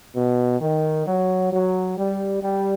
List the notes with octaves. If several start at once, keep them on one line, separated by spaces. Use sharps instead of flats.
B2
D#3
F#3
F#3
G3
G3